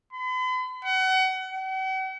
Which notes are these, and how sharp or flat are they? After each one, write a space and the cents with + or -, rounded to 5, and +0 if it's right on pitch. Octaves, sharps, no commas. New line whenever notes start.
B5 +45
F#5 +30
F#5 +45